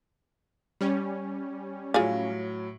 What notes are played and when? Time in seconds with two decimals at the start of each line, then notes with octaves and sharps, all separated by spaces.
0.81 G3 C#4
1.94 A2 F#3 F4 G#4 F5